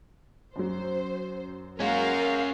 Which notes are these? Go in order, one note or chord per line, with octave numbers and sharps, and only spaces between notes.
F#2 F#3 C5
G#3 A#3 C#4 F#4 A#4 F5 F#5